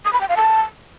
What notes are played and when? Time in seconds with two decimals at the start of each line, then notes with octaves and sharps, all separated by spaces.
0.05 D#6
0.13 B5
0.21 G5
0.29 F5
0.37 A5